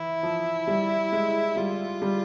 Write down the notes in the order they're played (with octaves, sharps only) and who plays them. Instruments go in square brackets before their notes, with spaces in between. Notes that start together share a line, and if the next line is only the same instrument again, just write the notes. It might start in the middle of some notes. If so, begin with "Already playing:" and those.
Already playing: [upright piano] E3 [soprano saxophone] E4
[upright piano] F3
G3
G#3
[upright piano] G3 [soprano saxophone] F4
[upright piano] G3